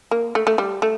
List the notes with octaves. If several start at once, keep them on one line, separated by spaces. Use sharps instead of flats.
A#3
A3
A3
G3
A3